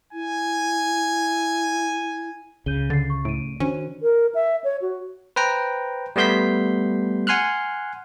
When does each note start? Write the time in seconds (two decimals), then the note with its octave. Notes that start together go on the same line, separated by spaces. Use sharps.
0.13 E4 G#5
2.66 C#2 C#3 G6 D#7 G7
2.90 D3 A6 C7
3.10 C#6
3.25 A2 D7 D#7
3.60 D#3 C#4 D4 F#4 C5 D#7
4.03 A#4
4.35 E5
4.64 C#5
4.82 F#4
5.36 B4 C5 G5 A#5
6.16 G3 A3 B3 C6 G6 B6
7.27 F#5 G#5 C6 F6 F#6